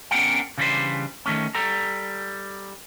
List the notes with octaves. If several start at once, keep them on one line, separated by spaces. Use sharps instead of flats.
B3 C#4 D4 A#4 F#5 G5
C#3 E3 G3 D4 B4 C5
D#3 A3 C#4
G3 A4 A#5